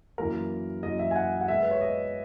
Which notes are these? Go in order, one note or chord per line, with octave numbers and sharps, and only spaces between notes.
F#2 E3 A#3 A#4
F#2 E3 A#3 D#5
E5
G#5
F#5
F#5
B2 G#3 B3 E5
B4
C#5
D#5